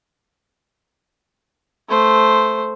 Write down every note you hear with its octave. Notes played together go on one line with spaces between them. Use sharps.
A3 C5